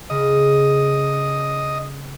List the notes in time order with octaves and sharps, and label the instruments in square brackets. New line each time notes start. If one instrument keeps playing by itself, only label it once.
[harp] C#3 [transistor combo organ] D#5